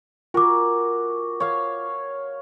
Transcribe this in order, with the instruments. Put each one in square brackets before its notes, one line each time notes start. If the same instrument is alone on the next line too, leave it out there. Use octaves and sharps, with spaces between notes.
[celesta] F4 D6 [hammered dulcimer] F#4 A#4 G#5
[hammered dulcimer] C#5 F5